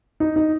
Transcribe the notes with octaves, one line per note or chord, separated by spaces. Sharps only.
D#4
D#4